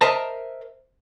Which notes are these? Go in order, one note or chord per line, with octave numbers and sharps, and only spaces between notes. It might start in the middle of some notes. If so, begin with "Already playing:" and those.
A#4 C5 D#5 E5 A5 A#5